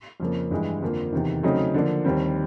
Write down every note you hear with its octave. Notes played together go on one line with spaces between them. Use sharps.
F2 C#3 F3 A#3
G2 E3 G#3
F2 D3 F3 A#3
E2 C3 D#3
C#3 F#3 A3 C4 D#4
D3 F3 A#3 D4
D#2 D#3 G3 C4